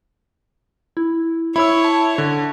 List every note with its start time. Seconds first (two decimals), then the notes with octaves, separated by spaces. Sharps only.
0.97 E4
1.56 E4 C#5 B5 E6
1.84 A5
2.18 D3